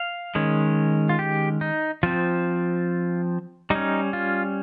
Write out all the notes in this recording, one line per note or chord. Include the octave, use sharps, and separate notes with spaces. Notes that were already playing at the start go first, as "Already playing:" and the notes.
Already playing: F5
D#3 G#3 C#4
F4
G4
D#4
F3 C4 F4
G3 C#4 D#4
F4